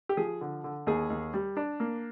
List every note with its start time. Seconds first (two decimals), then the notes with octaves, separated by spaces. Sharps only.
0.09 G4
0.17 F3 G#4
0.41 D3
0.64 D3
0.87 D#2 G#4
1.10 D#2
1.34 G3
1.57 D4
1.80 A#3